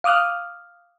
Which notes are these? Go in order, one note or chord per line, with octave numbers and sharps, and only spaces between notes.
F5 D6 D#6 F6 F#6